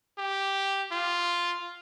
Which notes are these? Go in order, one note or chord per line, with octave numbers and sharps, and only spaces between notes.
G4
F4